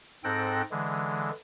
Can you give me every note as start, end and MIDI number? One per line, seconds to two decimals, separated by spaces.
0.24 0.62 44
0.24 0.62 60
0.24 0.62 69
0.24 0.62 79
0.24 0.62 90
0.24 0.62 94
0.71 1.30 50
0.71 1.30 52
0.71 1.30 56